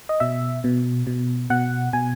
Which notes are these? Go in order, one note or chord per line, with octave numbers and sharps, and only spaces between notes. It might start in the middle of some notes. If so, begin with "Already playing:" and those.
D#5
B2 E5
B2
B2
B2 F#5
B2 G#5